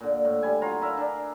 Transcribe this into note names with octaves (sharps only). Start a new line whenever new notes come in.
A#2 D3
A2
G3 G#5
F#3 F4 A#5
E4 A#4 E5 F5
D4